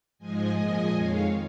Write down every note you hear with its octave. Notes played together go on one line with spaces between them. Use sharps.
G#2 F3 G#3 D#5 G#5
A#2 F3 G#3 D#5 G#5
F2 D#3 G#3 C#5 F5